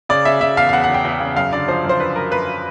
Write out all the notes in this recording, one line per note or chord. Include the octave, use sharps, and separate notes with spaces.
C#3 D5
C#3 E5
C#3 E5
E2 F5
F5
E2 F#5
F#5
E2
G5
E2
C#3
F#2 F5
D3 D5
F3 C5
F#2
C5
D3 B4
F#2 A#4
F#2 B4